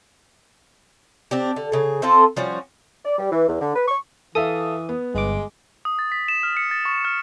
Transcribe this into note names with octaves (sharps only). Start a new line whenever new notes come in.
C4 D4 G4
D3
C#3 G#4
C4 F4 A4 C5
F3 G3 C#4 F#4
D5
G3
E3
E2
D3
B4
C#6
E3 A4 E5 F5 D#6
B3
G1 G#3 D6
D#6
A6
B6
E7
F6
C#7
A6
C#6
F6